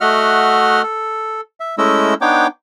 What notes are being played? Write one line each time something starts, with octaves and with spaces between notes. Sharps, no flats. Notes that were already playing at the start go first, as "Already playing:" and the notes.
A3 F#4 D#5 E5 F#5 F6
A4
E5
G#3 A3 C#4 E4 D#5 E6
B3 D4 D#4 C#5 G5 D6